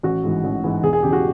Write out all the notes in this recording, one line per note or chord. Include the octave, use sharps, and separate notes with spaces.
A1 F#4
G#2 E3
A1
G#2 E3
E1 G#4
G#4
E2 C#3 G4
F#4